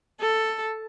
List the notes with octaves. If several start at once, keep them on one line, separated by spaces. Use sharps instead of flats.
A4